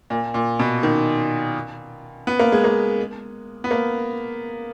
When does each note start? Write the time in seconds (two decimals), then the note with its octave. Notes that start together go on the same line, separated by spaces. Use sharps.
0.10 A#2
0.34 A#2
0.59 B2
0.83 D#3
2.27 B3
2.39 A#3
2.52 G#3
2.64 A#3
3.64 B3
3.71 A#3